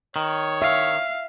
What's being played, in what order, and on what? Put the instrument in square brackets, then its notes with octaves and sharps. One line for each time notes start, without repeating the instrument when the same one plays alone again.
[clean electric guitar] D#3 [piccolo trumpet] C#5
[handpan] E5 [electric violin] F5